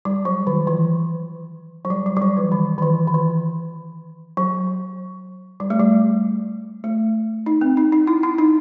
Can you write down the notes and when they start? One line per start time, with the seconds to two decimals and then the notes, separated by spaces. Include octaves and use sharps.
0.05 G3
0.25 F#3
0.47 D#3
0.67 E3
1.85 F#3
1.90 G3
2.06 G3
2.17 G3
2.22 F#3
2.37 E3
2.52 D#3
2.78 D#3
2.82 E3
3.08 D#3
3.14 E3
4.37 F#3
5.60 G3
5.70 A3
5.80 G3
6.84 A3
7.46 D#4
7.61 C4
7.77 D#4
7.92 D#4
8.07 E4
8.23 E4
8.38 D#4